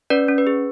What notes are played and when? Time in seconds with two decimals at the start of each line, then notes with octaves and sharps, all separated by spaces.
0.10 C#4 B4 D5
0.28 C#4
0.38 B4
0.47 G#4